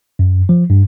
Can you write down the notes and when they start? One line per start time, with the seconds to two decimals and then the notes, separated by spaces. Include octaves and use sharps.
0.19 F#2
0.49 F3
0.70 G2